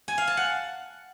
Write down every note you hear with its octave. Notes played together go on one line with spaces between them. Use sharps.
G#5
F5
A5
F#5